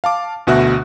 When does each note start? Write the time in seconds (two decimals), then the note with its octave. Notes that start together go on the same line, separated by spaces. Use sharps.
0.04 F5 A5 D6
0.47 D2 B2 F#4 E5 F#6